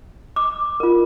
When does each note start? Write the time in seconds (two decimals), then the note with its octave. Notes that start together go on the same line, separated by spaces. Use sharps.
0.36 D6
0.80 F4 A#4